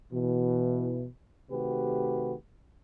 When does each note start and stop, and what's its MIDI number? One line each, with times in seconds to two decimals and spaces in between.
0.12 1.05 47
0.12 1.05 52
1.50 2.34 48
1.50 2.34 51
1.50 2.34 57
1.50 2.34 66
1.50 2.34 67
1.50 2.34 71